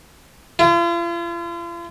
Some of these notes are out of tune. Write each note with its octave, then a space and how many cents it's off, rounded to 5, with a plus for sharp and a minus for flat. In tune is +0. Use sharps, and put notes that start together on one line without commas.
F4 -40